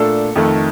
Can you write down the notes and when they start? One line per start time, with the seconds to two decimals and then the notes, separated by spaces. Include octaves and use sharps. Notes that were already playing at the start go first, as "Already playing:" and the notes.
Already playing: A#2 A3 D4 A4
0.36 F2 D#3 A3